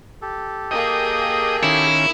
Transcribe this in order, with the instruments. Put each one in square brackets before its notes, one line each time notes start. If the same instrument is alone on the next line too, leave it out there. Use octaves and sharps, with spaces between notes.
[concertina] G4 A4
[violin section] A#3 G#4 [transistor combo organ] D#5 G5 D#6
[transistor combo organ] D#3 C#4 [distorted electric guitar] E4